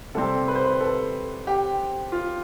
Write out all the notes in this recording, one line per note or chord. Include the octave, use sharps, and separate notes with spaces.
C3 G3 C4 A4
B4
C5
B4
A4
G4
F4